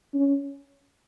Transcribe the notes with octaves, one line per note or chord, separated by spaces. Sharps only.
C#4